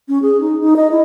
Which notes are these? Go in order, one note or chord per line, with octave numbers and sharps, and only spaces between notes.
C#4
G#4
D#4
D#4
D#5
E4